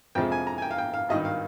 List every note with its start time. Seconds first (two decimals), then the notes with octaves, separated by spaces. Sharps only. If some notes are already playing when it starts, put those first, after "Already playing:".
0.15 F2 C3 F3 G#3 G5
0.32 G#5
0.47 A#5
0.58 G#5
0.62 G5
0.71 F5
0.78 G5
0.94 F5
1.09 G#1 G2 D#3 D#5
1.25 F5